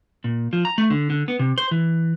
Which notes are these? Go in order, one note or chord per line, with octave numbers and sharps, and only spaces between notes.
A#2
F3
A#5
A3
D3
D3
B3
C3
C5
E3